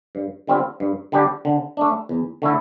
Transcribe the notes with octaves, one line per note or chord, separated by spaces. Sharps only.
G2
D3 G3 C4 F4
G2
D3 G3 D4 G4
D3
A3 D4
E2
D3 A3 E4